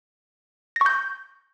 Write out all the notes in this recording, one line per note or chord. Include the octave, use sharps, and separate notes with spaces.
C#6 G6 A#6